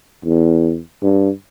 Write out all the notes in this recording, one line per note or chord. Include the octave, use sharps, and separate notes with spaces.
E2
G2